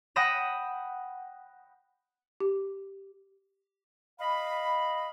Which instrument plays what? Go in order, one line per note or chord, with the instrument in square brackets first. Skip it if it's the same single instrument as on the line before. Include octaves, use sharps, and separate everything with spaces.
[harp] F#5 G5 B5 D#6 A#6 E7
[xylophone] G4
[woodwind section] D#5 F5 B5